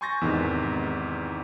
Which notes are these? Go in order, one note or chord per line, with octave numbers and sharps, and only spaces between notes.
G#5 C6 C#6 G6 A6 A#6
E2 G#2 C3 D#3